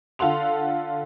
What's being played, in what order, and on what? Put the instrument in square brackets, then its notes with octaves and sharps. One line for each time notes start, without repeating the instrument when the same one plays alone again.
[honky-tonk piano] D3 F4 A4 F#5 C6 F7